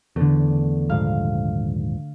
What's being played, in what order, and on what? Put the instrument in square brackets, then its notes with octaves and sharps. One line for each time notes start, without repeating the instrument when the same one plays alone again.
[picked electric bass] E2 [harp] D3 A3
[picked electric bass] D#1 G#2 F3 [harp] F5